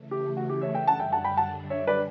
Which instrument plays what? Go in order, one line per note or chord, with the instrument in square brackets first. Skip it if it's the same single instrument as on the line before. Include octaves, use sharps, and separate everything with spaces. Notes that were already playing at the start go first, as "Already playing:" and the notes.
Already playing: [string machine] C#3 E3 A3
[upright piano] G4
F#4
G4
C#5 E5
E5 G5
[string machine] F#2 D3 G3 D4 [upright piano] F#5 A5
[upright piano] E5 G5
F#5 A5
G5 B5
F#5 A5
C#5 E5
B4 D5